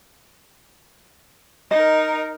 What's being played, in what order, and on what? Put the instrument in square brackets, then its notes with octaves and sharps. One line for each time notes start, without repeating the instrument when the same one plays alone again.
[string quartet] D#4 A#4 [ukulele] D#5